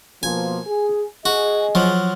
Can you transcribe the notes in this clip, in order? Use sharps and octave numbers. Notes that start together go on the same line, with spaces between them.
B2 F3 A#3 G#5
G#4
F#4 G#4 D#5
F3 F#3